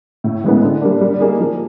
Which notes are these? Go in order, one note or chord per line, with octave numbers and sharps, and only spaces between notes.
A2
E3 G#3 B3
D3
G3 A#3 D4
G3
A#3 D#4 G#4
F3